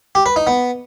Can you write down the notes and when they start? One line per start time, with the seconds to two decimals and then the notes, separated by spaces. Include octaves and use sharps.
0.15 G4
0.26 B4
0.36 D#4
0.47 B3